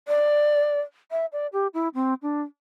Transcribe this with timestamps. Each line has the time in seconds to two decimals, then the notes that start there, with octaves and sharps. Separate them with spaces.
0.08 D5
1.11 E5
1.33 D5
1.53 G4
1.74 E4
1.95 C4
2.22 D4